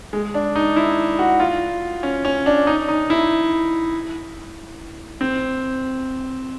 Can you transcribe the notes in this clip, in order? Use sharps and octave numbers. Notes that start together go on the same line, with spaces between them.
G#3
D4
D#4
E4
F#4
F4
C#4
C#4
D4
D#4
D#4
E4
C4